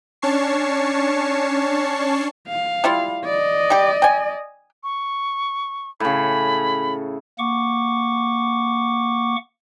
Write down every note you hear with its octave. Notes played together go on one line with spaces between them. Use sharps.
C#4 D4 C#5 A5 C#6 C7
F5
G3 E4 F4
D5 D#5
G3 G4
G5 G#5
C#6
A2 C#3 B5
A#3 F#5 C#6 D6